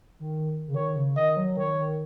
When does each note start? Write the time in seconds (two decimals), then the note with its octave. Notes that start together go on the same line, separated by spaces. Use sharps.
0.20 D#3
0.68 C#3
0.75 D#3 C#5
0.96 C#3
1.16 D#3 D#5
1.37 F#3
1.57 D#3 C#5
1.79 D#3